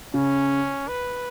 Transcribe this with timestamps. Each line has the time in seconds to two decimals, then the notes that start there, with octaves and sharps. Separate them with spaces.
0.13 C#3 C#4
0.88 B4